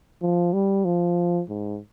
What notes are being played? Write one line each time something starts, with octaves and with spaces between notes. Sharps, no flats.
F3
G3
F3
G#2